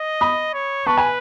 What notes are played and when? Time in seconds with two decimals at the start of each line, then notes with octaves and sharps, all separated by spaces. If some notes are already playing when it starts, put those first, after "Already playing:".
Already playing: D#5
0.21 B5 D#6
0.54 C#5
0.86 B4 A5 C#6
0.98 G#5 B5